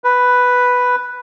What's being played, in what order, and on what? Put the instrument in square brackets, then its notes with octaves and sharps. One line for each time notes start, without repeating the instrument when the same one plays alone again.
[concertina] B4